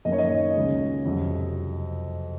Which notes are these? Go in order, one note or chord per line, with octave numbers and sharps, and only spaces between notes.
F#2 D#3 A#3 D#5
C#5
D#5
C#2 C#3 G#3
F2 C3 F#3